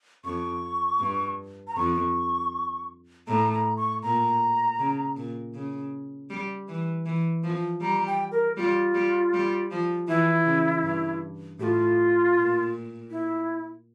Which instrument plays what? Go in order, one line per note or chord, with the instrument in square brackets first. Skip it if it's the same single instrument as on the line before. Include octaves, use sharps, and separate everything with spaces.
[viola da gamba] F2 [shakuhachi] C#6
[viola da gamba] G2
[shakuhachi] A#5
[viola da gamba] F2 [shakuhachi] C#6
[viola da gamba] A2 [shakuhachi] A#5
[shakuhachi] A#5
C#6
[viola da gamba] A#2 [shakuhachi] A#5
[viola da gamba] C#3
A#2
C#3
G3
E3
E3
F3
[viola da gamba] G3 [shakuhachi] A#5
[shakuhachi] G5
A#4
[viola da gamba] G3 [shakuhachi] F4
[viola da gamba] G3
G3
F3
[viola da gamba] E3 [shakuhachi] E4
[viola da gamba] C#3
G2
[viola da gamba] A2 [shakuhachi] G4
[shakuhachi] F4
[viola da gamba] A#2
[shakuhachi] E4